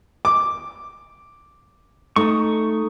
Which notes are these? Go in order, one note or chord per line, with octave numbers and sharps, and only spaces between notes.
D6
A3 D#4 C#6 D#6